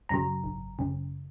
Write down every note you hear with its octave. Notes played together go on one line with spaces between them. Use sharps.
F#2 C#3 F#3 A#5
G#1
F#2 C#3